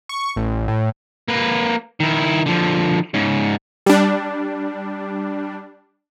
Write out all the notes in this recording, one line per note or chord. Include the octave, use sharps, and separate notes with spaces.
C#6
A1
A2
A#3 B4
D#3 E4
D3 F3
G#2 C#3
G3 D4